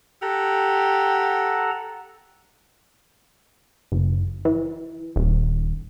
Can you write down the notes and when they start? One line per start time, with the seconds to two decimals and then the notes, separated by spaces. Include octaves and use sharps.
0.22 G4 A4 F#5 A#5
3.92 F#1
4.45 E3
5.16 D#1